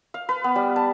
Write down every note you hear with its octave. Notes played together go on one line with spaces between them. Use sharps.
F5
B4
B3
G3
A5